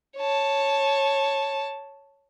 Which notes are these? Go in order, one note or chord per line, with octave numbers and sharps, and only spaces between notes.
C#5 A5